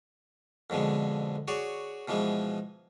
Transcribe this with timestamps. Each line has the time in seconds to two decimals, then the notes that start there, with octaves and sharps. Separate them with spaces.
0.70 F2 B2 D3 G#3
1.48 F#4 G#4 C#5 D5
2.08 B2 E3 F3 G#3